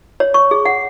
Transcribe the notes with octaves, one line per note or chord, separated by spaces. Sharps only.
C#5
C#6
G#4
F#5